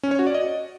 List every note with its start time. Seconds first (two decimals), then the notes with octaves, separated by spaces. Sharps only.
0.03 C#4
0.11 C#5
0.19 F#4
0.27 D5
0.34 D#5